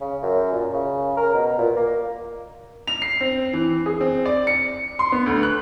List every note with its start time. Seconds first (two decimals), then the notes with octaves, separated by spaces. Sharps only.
0.01 C#3
0.22 F#2
0.52 A#2
0.73 C#3
1.17 A#4
1.34 B2
1.58 A#2
1.76 A#3
2.87 F7
3.02 C7
3.21 C4
3.53 E3
3.86 G#4
4.01 C4
4.26 D5
4.47 C#7
4.99 C6
5.12 B3
5.26 D2
5.43 F#6